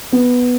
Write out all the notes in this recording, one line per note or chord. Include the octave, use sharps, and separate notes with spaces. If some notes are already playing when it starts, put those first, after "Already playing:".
B3